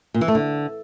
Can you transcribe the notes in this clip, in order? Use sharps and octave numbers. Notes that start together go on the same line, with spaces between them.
A#2
E3
A3
D3